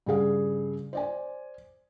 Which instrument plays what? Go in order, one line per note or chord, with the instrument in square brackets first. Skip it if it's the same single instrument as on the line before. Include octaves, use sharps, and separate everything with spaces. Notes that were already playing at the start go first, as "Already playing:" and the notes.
[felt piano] G2 C#3 G#4 F5
C5 D5 G#5